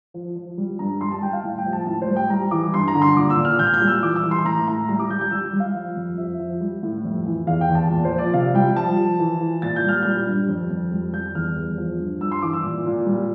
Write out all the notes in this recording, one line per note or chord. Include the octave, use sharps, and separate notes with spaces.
F3
F3
G3
G2 A#5
G3 C6
A5
G3 G5
F5
A2 G5
G5
F3
A5
A2 A5
C5
G3
G5
G3 A#5
E3 D6
G2 C6
A#5
D3
C6
A#2 D6
E6
A#2
F6
A#2 G6
F6
G6
G3
E6
E3 D6
E6
E3
C6
A2 A#5
A2 A#5
G3 A#5
D6
G3 G6
G6
G3 E6
G3
F5
F3
F2
F3 E5
F3
G3
A2
F2
E3
E2 F5
G5
E2
A5
A#2
C5
F3
D5
C3 F5
G3 G5
F3 A5
F3
E3
E3
A#2 A6
G6
G3 F6
G3 G6
G2
F2
F2
G3
G3 G6
E2 F6
E2
F3
G2
G2 E6
C6
E3 D6
E6
A#2
A#2
G3